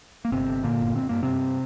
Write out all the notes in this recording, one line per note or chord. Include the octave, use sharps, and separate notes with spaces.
A#3
G1 C3 C4
D3
A#2 D3 A#3
G1
G1 C4
G2 A#3
G2 C3 C4